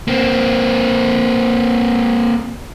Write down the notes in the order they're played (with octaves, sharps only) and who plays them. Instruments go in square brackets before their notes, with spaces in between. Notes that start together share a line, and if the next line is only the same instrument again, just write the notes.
[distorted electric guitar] A#3 C4